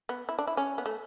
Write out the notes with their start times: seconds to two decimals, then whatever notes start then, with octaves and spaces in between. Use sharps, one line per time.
0.09 B3
0.29 E4
0.39 D4
0.47 E4
0.57 C#4
0.78 B3
0.86 A3